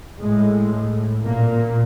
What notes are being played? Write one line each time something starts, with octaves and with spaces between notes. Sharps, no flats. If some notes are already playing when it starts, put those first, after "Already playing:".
A2 G#3
A#2 A#3